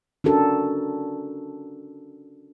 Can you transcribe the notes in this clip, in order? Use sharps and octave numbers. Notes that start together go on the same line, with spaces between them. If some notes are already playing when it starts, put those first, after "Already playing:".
C#4 D4 F#4 A4 A#4